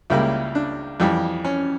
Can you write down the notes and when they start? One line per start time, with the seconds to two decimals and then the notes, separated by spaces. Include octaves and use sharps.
0.10 C#2 C#3 G3 A#3 E4
0.55 D4
1.00 F2 E3 G3
1.44 C#4